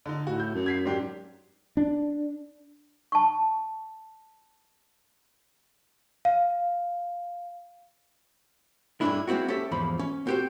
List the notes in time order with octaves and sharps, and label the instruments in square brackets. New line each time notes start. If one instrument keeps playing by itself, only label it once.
[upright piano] D3 D#4
[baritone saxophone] A2 [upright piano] F#4
[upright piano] G6
[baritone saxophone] F#2
[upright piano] G#6 B6 C7
G#2 D4 G4
[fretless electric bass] D4
[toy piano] A5 C#6
[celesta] F5
[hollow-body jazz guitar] G2 G#3 A#3 C#4 D4 E4
G#3 A#3 C4 E4 F#4
C#4 G4 A4 E5
E2 G#2 F3 B5
C#4
C4 F#4 G4 A#4 C5